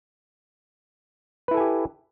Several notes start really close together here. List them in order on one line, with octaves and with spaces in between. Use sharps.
B4 E4 A4 G#5 G4